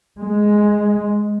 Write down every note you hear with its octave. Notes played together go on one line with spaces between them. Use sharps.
G#3